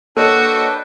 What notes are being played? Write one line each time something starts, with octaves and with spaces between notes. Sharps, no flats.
A#3 D4 F#4 A4 B4 C#5 D#5 G5